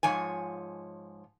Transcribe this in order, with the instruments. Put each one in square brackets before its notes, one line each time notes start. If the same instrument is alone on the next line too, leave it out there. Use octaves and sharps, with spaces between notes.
[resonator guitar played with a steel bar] G#2 F3 C#5 G#5